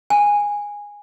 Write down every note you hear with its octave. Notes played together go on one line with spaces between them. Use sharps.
G#5